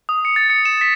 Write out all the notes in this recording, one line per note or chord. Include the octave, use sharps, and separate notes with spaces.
D#6
C#7
A6
C#7
E7
B6